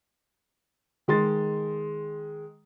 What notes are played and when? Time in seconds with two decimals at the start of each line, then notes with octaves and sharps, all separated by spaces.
1.08 D#3 G#3 C6 A6